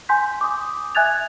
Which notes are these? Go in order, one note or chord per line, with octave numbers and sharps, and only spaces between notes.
G#5 C6 G6 B6
D6 D#6
E5 G#5 F#6 G#6 A6 F7